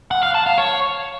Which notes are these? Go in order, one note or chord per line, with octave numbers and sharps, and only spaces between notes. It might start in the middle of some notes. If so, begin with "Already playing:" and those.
F#5
F5
A5
F5
C#5